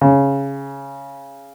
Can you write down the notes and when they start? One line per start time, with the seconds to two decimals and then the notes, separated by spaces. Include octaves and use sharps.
0.01 C#3